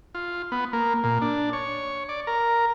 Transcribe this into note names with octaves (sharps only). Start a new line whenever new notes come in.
F4
B3
A#3
A#2
D4
C#5
D5
A#4